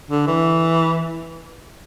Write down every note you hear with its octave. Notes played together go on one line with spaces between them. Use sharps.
D3
E3